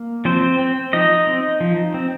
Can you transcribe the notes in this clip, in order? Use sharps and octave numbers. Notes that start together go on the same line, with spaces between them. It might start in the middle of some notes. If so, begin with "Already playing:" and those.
Already playing: A#3
F3 C4 C5
C4
F3 D#4 D#5
C4
F3
C4